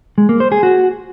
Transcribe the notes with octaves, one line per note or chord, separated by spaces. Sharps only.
G#3
A#3
C5
G#4
F#4